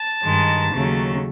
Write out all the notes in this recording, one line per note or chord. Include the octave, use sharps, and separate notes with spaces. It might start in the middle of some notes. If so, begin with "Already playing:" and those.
Already playing: A5
G2 D#3 G#3
D#2 C#3 F#3 A3